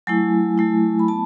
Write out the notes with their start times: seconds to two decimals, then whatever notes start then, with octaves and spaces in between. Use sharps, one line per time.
0.07 F#3 A3 E4 G#5
0.58 F#3 A3 E4
0.99 B5
1.08 B3 A5